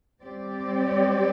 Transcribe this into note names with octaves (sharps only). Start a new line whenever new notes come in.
G3 C4 G4 D5